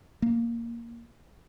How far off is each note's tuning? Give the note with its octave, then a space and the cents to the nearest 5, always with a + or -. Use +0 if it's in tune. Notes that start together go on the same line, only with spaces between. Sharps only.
A#3 +0